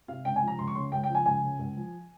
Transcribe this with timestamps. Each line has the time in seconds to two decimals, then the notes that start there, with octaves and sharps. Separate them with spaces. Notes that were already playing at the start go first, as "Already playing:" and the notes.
0.08 C3 F5
0.25 C#2 G5
0.36 G#5
0.42 F3
0.48 A#5
0.59 C#2 C6
0.67 C#6
0.75 C#3 C6
0.92 C#2 G5
1.04 G5
1.09 F3
1.15 G#5
1.26 C#2 G#5
1.43 C#3
1.59 C#2
1.77 F3